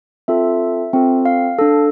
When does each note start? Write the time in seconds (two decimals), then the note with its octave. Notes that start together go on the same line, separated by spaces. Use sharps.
0.28 C4 F4 A4 E5
0.93 C4 F4 A4
1.25 F5
1.59 D4 A4